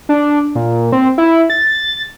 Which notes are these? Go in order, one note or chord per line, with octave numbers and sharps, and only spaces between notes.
D4
A#2
C4
E4
A6